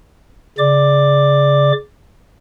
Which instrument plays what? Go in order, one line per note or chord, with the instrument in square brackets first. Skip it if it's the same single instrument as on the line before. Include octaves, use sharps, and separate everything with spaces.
[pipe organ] C#3 D5 D6